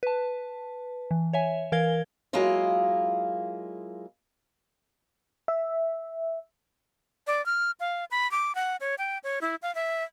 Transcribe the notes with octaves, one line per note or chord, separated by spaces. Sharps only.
B4 A5
E3
C#5 E5 G#5
E3 A#4 F5 G#6 G7
F#3 G#3 A#3 E4 F4 D#5
E5
D5
F6
F5
B5
D6
F#5
C#5
G5
C#5
E4
F5
E5